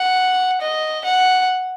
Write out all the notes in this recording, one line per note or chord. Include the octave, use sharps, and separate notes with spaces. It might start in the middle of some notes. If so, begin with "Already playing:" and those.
Already playing: F#5
D#5
F#5